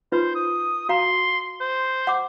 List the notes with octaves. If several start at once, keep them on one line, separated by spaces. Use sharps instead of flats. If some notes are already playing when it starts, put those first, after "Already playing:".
D#4 F4 B4 C5
D#6
F#4 F5 A#5 C6
C5
F#5 D6